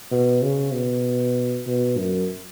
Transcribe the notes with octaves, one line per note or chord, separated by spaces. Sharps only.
B2
C#3
B2
B2
F#2